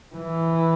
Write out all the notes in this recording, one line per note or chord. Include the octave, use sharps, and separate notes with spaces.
E3